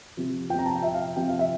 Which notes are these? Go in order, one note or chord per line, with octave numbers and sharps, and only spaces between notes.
C3 F3
C3 F3 G5
A#5
A5
G5
C3 F3 E5
F5
C3 F3 G5
F5
E5